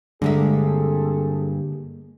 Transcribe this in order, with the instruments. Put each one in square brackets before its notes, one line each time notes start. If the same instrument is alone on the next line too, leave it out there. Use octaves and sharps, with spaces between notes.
[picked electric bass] G2 [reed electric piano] D3 [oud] G#3 A#3 E5 [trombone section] C4 G#4 A4